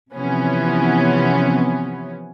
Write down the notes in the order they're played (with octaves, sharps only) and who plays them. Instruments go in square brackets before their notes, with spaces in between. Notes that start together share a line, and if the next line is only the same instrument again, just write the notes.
[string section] C3 E3 F3 B3 C#4